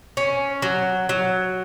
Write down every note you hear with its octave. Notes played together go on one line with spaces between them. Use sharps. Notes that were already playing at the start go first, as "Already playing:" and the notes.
C#4
F#3
F#3